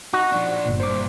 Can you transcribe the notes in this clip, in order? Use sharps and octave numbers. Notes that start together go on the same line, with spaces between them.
D#4 F#4
F3 D4
G1 A#2
G2 A#2 C5 D6